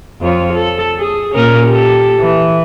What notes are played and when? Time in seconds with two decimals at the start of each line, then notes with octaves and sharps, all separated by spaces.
0.21 F2 F4 C#5
0.54 A4
0.99 G#4
1.35 A#2 C#4 A#4
1.67 G4 A4
2.20 E3